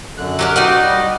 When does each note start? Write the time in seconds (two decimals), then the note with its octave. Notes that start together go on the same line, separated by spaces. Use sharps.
0.18 F#2 D3 F#6
0.39 F#3 G4 A#4
0.56 D#4 F#4 G4 D5 F#5
0.83 G3 D#5